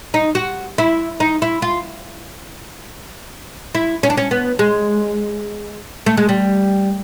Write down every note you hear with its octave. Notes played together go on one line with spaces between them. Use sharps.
D#4
F#4
E4
D#4
E4
F4
E4
C#4
D4
C#4
B3
G#3
A3
G#3
G3